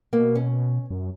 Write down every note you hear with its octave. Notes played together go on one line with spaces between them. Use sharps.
B2 A#3
C#4
F#2